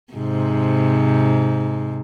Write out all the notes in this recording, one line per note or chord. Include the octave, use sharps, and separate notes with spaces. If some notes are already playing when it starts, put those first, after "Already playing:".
G#2 C3